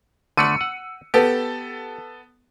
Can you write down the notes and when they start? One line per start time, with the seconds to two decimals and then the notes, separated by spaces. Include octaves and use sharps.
0.37 D3 A3 D5 E6 C#7 D#7
0.61 F#5
1.14 B3 G4 A4